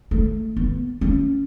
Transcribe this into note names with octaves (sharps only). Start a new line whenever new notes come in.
A3
B3
C#4